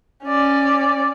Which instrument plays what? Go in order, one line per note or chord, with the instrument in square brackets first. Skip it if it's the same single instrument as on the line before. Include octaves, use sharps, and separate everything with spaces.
[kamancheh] C#4 D5